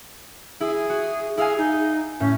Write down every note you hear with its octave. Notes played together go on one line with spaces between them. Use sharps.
E4 G#4
F#4
E4 G#4 F5 G#5
D#4
A2 C#4